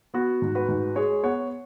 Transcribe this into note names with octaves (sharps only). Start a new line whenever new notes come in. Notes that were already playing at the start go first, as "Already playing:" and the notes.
B3 F#4
G#2
F#4 B4
G#2
G#3 G#4 C#5
B3 C#5 F#5